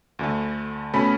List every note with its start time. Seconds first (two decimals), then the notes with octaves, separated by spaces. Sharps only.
0.19 D2 D3 A3
0.94 B2 A3 C#4 B5